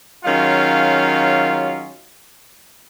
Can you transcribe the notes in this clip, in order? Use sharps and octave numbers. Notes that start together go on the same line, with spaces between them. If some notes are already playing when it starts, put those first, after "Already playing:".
D#3 F#3 G#3 C#4 F4 F5